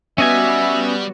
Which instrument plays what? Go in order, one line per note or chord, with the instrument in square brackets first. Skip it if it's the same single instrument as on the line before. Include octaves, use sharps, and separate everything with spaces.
[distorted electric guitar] G3 [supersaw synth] B3 F#4 [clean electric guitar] C#4 D#5 G#5 [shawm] E5